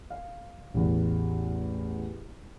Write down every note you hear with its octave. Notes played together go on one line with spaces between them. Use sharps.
F5
A1 E2